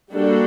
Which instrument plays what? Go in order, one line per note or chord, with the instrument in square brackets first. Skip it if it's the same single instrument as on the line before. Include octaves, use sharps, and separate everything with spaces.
[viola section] G3 A#3 D4 F#4 A4